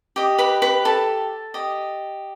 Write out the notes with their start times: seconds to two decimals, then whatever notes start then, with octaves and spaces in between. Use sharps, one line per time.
0.16 G4 D#5
0.38 B4 B5
0.62 B4 B5
0.85 A4 A5
1.54 G4 D#5